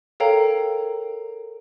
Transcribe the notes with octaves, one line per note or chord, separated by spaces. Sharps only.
A4 A#4 C#5 F5 G5 A#5